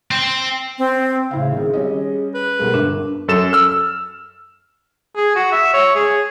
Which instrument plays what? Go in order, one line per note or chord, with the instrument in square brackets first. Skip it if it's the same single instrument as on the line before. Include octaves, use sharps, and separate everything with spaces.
[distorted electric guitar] C4
[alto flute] C4
[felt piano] A1 E4 F5 [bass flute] C#3
[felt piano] D#3 C4 [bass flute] G#4
[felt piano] G3 C#4 D#5
[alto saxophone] B4
[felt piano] B1 G3 G#3 [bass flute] A#4
[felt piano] G1 [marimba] D4
[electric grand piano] F#2 A4 E7
E6 F6
[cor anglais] G#4
F#4
E5
C#5
G#4